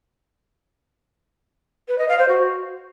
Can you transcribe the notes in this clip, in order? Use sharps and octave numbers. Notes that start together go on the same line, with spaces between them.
B4
D#5
F5
C5
F#4